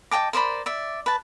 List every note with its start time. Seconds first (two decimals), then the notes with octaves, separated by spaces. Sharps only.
0.11 D#5 G5 A5 D6
0.33 A#4 C5 D5 B5
0.66 D5 E5
1.06 B4 A5